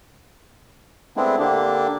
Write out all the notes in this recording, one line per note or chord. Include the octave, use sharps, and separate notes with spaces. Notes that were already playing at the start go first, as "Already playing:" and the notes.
G#3 A3 B3 C4 D4 E4
D3 A#3 D4 G4